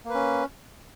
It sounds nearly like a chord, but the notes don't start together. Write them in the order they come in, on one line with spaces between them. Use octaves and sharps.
A#3 B4 C#4